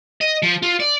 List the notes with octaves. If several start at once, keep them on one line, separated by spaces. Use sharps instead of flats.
D#5
F3
F4
D5